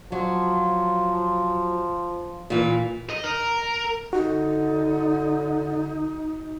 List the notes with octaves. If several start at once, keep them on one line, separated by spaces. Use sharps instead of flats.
F3 F#3
A#2 E3
D#5
A#4
D3 D#4 F#4